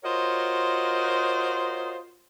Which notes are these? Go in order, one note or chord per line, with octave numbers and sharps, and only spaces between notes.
F4 F#4 A#4 C5 C#5 D#5